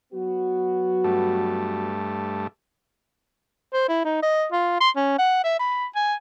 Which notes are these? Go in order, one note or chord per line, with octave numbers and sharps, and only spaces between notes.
F#3 B3 F#4
G2 A3
C5
E4
D#4
D#5
F4
C6
C#4
F#5
E5
B5
G#5